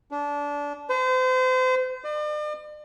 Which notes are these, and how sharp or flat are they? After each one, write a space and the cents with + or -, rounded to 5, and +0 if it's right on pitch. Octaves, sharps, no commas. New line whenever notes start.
D4 -20
C5 -35
D5 +45